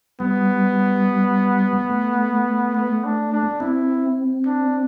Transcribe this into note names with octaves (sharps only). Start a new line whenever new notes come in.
G3 B3
A3
B3
D4
D4
C4 E4
D4